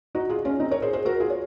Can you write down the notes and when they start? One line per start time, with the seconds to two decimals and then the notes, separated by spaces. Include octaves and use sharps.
0.15 D#4 F#4
0.29 F4 G#4
0.45 C#4 F4
0.60 C4 D#4
0.71 A#4 C#5
0.82 G#4 C5
0.93 G#4 C5
1.05 F#4 A#4
1.20 F4 G#4
1.30 C#5